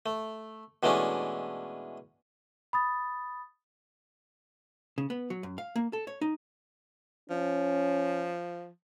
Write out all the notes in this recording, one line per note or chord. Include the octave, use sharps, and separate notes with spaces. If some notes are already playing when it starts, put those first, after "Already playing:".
A3
B2 E3 G#3 A3 C#4 D4
B5 D#6 A6
C#3
B3
F#3
F#2
F5
A#3
A4
C#5
D#4
F3 C#4